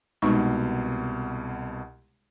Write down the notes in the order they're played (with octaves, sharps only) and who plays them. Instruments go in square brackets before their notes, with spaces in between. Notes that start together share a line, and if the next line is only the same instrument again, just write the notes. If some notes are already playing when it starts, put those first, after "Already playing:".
[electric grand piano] C2 B2 [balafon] G#3 D#4 C#6